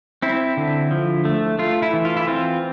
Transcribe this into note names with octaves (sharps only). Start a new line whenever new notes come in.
C4 E4
D3
F3
A3
A3 F4
E4
E3
F4
E4
C4 F4